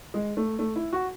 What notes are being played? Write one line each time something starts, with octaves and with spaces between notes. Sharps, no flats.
G#3
A3
A3
E4
F#4